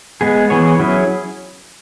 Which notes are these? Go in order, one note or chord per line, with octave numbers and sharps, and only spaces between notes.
G#3 B3 G#4
E3 B3 G#4 C#5
F#3 C#4 E4 G#4